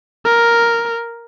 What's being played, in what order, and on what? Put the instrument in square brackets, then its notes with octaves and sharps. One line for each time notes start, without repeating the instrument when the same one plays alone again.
[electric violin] A#4